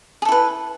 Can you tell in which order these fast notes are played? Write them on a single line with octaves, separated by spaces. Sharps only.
G#4 A4 E4 B4